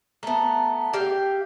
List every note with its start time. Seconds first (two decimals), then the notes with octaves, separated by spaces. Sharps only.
0.23 A3 B3 E5 A5 A#5
0.93 G4 E5 F5 G5